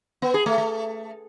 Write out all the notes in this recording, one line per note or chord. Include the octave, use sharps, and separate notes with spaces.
B3
G#4
A3
A3